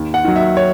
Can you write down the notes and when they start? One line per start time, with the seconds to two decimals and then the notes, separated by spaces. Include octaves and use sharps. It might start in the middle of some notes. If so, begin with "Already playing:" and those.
Already playing: D#2
0.14 F#5
0.25 D#3 F#3
0.36 E5
0.57 C#5